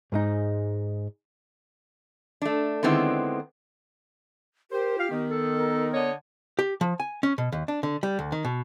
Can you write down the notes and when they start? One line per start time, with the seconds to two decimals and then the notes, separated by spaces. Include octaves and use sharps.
0.12 G#2 G#3 D#4
2.42 A3 D4
2.83 D3 D#3 G#3 B3 C4 E4
4.71 G4 A#4 C5
4.98 F4 F5
5.11 D#3 B3
5.31 A4
5.55 A#4
5.93 D3 C#5 D#5
6.59 G4
6.81 F3
7.00 G#5
7.23 C#4
7.38 B2
7.52 D#2
7.68 D4
7.83 D3
8.03 G3
8.19 D2
8.32 D#3
8.45 B2